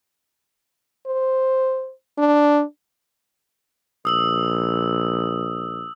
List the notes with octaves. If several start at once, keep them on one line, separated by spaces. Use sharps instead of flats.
C5
D4
A#1 D#6 E6 F#7